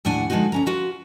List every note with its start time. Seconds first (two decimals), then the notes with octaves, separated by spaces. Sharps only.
0.05 D#2 A2 D4 F#5 G#5
0.30 D3 F3 G#3 C4 D#4 F#4
0.52 D2 C#4 A#5
0.66 F4 F#4 B4